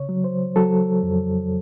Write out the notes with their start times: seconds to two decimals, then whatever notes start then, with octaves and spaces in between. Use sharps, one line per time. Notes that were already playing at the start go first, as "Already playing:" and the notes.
Already playing: C#3 C#5
0.09 F#3
0.24 C5
0.56 F#3 A4
1.03 F2